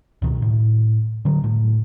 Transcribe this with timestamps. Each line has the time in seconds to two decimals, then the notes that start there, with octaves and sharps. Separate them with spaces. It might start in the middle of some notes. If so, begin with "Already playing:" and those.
0.22 C#2 B2 D#3
0.42 A2
1.25 D3 F#3
1.44 A2 A3